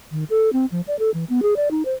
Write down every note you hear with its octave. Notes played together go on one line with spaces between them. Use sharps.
D#3
A4
C4
F3
D5
A4
E3
B3
G#4
D5
D#4
C5